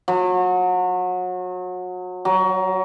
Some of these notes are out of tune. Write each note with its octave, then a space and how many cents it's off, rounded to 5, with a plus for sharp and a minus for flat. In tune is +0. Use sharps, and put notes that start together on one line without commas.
F#3 -30
F#3 +25